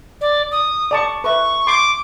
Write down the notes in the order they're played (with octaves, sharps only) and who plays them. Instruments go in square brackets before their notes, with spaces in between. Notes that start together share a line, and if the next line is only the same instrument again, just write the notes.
[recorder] D5
D#6
[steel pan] D5 A5 C#6
[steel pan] B4 E5 [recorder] C#6
[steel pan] C6 [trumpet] D6